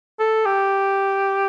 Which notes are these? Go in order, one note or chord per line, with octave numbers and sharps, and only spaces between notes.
A4
G4